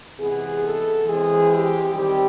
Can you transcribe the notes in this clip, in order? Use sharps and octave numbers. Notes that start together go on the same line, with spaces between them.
C3 E3 G#3 B3 G#4
A4
E3 G#3 C4 G#4
G4
D#3 G3 C4 G4